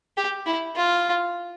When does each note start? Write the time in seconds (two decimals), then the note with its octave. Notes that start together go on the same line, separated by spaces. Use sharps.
0.17 G4
0.46 E4
0.76 F4